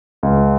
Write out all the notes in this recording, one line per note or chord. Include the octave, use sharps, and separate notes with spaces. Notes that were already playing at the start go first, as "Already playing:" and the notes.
C#2